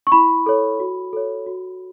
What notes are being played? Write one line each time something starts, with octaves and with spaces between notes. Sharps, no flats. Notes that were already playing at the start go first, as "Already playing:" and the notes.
C#6
E4 B5
A4 C#5
F#4
A4 C#5
F#4